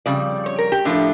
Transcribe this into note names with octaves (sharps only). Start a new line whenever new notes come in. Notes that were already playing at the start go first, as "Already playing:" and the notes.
F2 C#3 G3 D5
C#5
A#4
G4
A2 F3 A3 D4